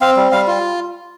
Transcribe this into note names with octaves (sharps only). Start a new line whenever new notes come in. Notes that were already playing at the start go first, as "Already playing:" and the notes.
C4 F5
G3
G3 F5
F4